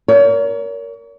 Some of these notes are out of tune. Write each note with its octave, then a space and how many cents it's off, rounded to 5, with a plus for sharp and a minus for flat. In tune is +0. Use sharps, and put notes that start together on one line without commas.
A#4 +0 C#5 +35